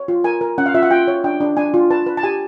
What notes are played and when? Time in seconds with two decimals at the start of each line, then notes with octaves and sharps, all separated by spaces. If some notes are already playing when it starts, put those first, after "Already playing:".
Already playing: C#5
0.08 F4
0.24 A#4 G#5
0.41 A#4
0.58 C#4 F#5
0.66 F5
0.74 F4 E5
0.83 F#5
0.91 F4 G5
1.08 C#5
1.24 D4 G5
1.41 D4
1.57 D4 G#5
1.74 F4
1.90 B4 A5
2.06 B4
2.17 A5
2.23 G4 G#5